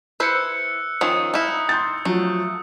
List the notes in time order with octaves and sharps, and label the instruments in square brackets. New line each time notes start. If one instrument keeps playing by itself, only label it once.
[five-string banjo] E4 B4 C5 [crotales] E6 F#6 C#7
[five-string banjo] D#3 F3 C#4 [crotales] D#6
[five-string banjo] D#4 E4 [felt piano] F6
[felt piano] C6 G6 A6
[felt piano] F3 F#3 [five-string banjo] A3